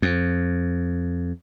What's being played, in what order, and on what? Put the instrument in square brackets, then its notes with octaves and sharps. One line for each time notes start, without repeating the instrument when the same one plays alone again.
[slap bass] F2